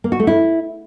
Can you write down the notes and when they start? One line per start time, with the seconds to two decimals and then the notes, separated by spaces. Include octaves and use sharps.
0.04 A#3
0.12 F#4
0.20 A3
0.27 E4